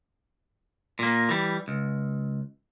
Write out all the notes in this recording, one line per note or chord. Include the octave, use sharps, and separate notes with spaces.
A#2 A#3
E3 G3
C#2